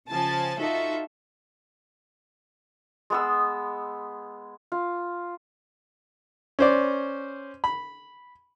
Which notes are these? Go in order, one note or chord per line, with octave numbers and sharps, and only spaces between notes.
C#3 F3 G#5 A5 A6
D#4 F4 F#4 A4 E5
G#3 B3 E6
F4
C#4 C5 D5
B5